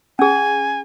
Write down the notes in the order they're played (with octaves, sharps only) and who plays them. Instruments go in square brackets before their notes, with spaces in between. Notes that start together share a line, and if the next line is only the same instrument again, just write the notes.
[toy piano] C#4 G#4 [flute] G#5